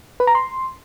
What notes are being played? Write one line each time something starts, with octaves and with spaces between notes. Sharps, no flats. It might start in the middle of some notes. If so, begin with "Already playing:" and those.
B4
A#5
C6